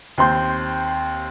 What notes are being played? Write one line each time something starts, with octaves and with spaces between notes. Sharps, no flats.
D#2 C4 C6 G6